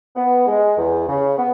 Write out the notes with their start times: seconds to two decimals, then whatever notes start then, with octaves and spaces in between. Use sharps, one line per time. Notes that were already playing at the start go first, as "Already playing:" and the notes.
0.16 B3
0.47 G#3
0.78 E2
1.08 C#3
1.38 B3